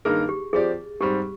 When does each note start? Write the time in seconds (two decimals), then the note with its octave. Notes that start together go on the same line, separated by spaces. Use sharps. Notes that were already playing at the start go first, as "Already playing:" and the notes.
0.05 G2 D#3 A#3 D#4 G#4 A#4
0.29 G4
0.53 F3 C4 G4 G#4 D5
1.00 G#2 G3 C4 G4